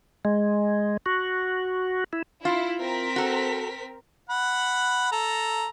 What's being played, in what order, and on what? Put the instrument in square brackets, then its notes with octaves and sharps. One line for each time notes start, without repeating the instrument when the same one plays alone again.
[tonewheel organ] G#3
F#4
E4
[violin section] E4 [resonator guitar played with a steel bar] F4
[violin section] C4 A#4 B6
[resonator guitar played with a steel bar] F#4 A4
[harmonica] F#5 B5
A4 A#5